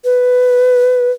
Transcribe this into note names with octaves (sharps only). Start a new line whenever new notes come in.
B4